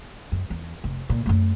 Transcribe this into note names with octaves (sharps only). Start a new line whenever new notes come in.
F#2
E2
F1
A#2
F#2 A3